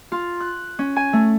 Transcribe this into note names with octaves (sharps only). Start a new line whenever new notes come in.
F4
F#6
C#4
G#5
A3